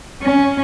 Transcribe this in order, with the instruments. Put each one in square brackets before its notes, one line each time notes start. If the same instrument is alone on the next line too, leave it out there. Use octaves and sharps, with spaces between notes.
[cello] C#4